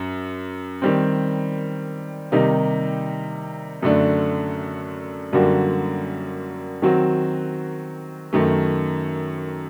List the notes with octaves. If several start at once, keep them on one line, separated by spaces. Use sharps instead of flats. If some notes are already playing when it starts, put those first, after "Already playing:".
Already playing: F#2
D#3 G3 C4
C3 D#3 G3 A#3 D#4
F#2 D3 A3 D4
F#2 D3 G3 A#3 F#4
D#3 F#3 C4 F#4
F#2 D#3 A3